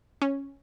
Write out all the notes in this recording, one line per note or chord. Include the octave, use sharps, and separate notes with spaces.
C#4